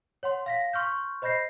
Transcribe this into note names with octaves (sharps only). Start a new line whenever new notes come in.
C#5 F#5 C6
F5 A#6 B6
C6 C#6 F6 G6
C5 D#5 B5 G6 A#6 C7